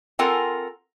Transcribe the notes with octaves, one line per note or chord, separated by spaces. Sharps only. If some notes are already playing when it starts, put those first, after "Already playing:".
C4 F4 A4 A#4 F#5 G#5